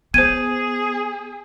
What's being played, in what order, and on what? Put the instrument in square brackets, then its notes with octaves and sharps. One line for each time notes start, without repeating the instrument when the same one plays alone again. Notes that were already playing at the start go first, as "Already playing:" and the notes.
[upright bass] B3 [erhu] G#4 [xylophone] C5 G#6 [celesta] D#7